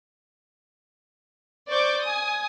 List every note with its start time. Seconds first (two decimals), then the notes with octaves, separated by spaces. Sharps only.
1.69 C5 D5 C#6 D6 G6
2.04 G#5 D#6